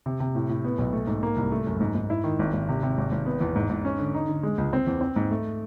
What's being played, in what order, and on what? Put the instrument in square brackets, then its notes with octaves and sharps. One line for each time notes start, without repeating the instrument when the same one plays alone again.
[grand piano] C3
C3
A2
A2
B3
B1
A3
G#2
A#3
C2
A3
F#2
G#2
G#2
E4
D#3
G#1
G#1
C3
C3
G#1
G#1
B3
E2
G#2
G#2
C#4
D3
D#4
D3
G#3
C#2
C4
E2
C4
G#2
A3